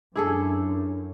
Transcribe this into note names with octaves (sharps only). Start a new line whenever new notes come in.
F#2 D4 E4 G#4 A4